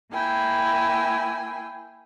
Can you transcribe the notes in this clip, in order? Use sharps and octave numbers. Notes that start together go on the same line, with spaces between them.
A#3 E4 G5 G#5